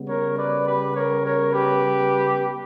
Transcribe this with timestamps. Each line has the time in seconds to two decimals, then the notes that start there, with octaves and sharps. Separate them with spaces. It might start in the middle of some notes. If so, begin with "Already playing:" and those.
Already playing: C#3 G3 B3
0.08 A#4 C#5
0.38 B4 D5
0.66 G4 B4
0.95 A#4 C#5
1.24 A#4 C#5
1.53 G4 B4